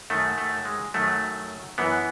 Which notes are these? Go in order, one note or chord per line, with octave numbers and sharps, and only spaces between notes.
F#2 D#3 F#3 A3
A3
G#3
F#2 D#3 F#3 A3
F#2 E3 B3